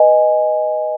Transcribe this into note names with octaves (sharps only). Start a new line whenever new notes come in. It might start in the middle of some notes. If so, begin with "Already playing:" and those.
Already playing: B4 D#5 G#5